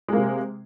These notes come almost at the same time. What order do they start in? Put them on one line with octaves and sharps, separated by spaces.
G#3 A#3 C3